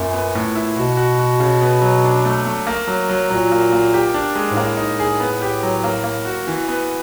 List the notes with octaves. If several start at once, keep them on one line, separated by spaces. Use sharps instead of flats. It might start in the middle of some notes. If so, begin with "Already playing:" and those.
Already playing: F#2 A#2
B3
A2
E4
B2 F#4
F#4
F#4
C#3
B3
F#3
D4
A3
A3
A#3
F#3
F#3
A#2 F#3
A#3
A#3
G4
D4
G#3
G#2
A2 A#3
D#4
G#4
B3
G4
F#3
A#3
A#3
F#4
E3
B3